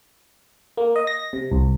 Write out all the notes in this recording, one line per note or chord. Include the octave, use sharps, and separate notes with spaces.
A#3
D#5
A#6
C3
C2